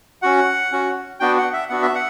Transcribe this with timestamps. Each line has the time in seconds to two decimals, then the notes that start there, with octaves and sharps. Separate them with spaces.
0.22 C#4 F#4 F#5
0.72 C#4 F#4
1.20 B3 D4 F#4 G5
1.37 F#5
1.53 E5
1.69 B3 D4 F#4 F#5
1.82 E5
1.95 F#5